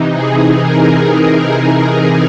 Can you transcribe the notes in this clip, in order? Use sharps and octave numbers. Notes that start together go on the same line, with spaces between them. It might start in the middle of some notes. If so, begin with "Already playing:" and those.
Already playing: C3 E3 D#4
G#4
A#4